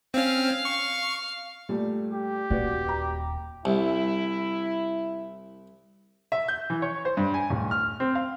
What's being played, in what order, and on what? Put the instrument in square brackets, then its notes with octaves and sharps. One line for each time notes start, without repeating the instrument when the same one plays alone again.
[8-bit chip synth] C4 C#4 [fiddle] F5
[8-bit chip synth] C#6
[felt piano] A#2 G3 A3
[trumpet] G4
[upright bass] D#1 [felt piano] F#4 B4 D5
[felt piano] A#5
[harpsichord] C2 [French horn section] E4
[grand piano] E5
G6
E3
C#5
C5
G2
G#5
D1
F6
C4
F5